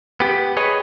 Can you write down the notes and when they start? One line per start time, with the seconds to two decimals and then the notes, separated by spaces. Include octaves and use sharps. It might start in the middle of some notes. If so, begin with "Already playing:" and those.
0.20 B3 G4
0.57 G#4 B4 C#5 D#5